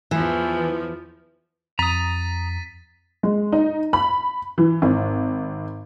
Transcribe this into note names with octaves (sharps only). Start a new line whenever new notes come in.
E2 E3 F3
F2 A#5 D#6 A6 B6 D#7
G#3
D#4
B5
E3
G#1